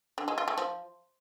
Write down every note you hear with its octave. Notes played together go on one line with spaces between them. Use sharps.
D3
G#3
F4
A3
F3